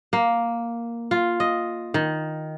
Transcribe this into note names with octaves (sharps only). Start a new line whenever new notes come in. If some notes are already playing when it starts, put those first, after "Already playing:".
A#3
F4
D#5
D#3